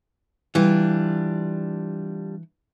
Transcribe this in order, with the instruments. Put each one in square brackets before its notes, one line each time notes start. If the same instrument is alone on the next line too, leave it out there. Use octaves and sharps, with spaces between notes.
[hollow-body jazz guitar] E3 [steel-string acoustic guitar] G3 D4 F4